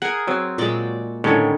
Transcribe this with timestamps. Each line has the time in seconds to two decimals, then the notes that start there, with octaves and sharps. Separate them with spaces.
0.02 G#4 A#4 F#5 G#5
0.28 F#3 C4
0.58 A#2 G#3 F#4 D5 G5
1.24 A2 D3 D#3 C#4 A4 C#5